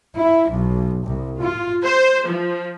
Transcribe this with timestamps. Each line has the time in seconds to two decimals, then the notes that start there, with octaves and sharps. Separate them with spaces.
0.15 E4
0.51 B1
1.04 C2
1.40 F4
1.84 C5
2.28 F3